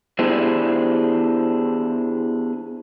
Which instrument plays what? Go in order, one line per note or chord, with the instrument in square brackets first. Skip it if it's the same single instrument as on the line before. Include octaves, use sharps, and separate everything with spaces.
[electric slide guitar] B3 D4 E4 G4 G#4 C5